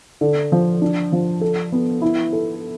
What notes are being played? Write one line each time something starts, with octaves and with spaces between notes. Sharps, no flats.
D3
F3
D4
F3
A4
B3
E4
A4